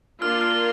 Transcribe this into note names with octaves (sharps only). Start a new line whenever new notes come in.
A#3 D4 F4 A#4 F6
F6